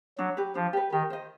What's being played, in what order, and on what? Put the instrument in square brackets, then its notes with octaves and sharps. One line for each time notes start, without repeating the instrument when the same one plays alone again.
[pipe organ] F#3 [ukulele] D4
[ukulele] G4 B4
[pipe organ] F3 [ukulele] D4
[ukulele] G4 B4
[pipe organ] D#3 [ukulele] G4
[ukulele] C5 D#5